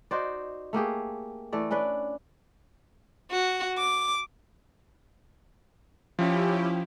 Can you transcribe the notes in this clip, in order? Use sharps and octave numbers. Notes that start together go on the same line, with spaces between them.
D#4 F#4 C5 D5
A3 A#3 G4 G#4
E3 A3 D5
C#4 D4 B4 D5
F#4
D6
F3 C#4 E4 G4